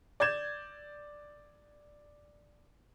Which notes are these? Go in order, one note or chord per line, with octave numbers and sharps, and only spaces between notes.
D5 G6 G#6 E7